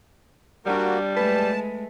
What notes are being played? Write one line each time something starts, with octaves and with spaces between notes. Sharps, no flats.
G3 A#3 D4 F#4
G#3 A3 B4 A5